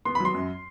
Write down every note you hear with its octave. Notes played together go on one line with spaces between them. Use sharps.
B3 C6
B5
F#3 C6
F#2